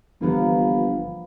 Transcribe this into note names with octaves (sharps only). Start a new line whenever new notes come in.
G1 F3 A#3 B3